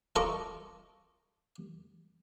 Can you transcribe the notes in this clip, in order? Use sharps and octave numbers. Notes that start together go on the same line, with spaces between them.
F4 A4 D#5 A#5 C#6 D6